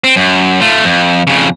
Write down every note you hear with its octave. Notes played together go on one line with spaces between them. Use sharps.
C4
F#2
A3 F4
F2
F2 C#3